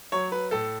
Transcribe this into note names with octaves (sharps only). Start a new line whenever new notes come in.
F#3 C#5
B4
A2 A4